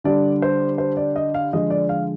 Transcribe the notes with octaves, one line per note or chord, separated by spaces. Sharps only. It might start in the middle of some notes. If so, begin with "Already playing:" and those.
D3 G3 D4 D5
C5
C5
D5
D#5
F5
D3 F3 G#3 D#5
D5
F5